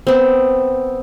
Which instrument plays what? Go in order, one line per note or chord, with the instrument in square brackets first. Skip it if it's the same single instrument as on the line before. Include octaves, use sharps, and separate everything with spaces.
[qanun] B3 C4